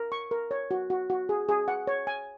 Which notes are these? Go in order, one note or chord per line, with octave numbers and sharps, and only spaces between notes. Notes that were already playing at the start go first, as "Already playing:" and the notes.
Already playing: A#4
C#6
A#4
C#5
F#4
F#4
F#4
G#4
G#4
F#5
C#5
G#5